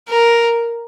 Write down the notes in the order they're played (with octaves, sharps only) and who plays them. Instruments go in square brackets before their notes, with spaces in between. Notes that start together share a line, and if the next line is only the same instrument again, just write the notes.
[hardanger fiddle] A#4